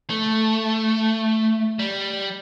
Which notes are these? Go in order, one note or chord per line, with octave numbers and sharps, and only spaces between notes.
A3
G3